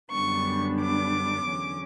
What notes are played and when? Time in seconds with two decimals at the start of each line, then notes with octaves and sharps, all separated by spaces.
0.12 F#2 D3 G3 B3 D4 C#6
0.80 D6
1.48 E2 D3 F#3 C#4